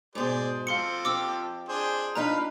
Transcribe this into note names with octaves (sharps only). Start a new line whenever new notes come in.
G#2 B2 G#4 C5 D5
F3 C4 A4 F5 C6 C#7
F2 G4 D6 E6
D4 G#4 C5
F3 D4 D#4 B4 F5 A#5 B5